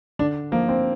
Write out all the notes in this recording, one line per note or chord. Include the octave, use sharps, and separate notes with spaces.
D3 D4
F3 A#3
C4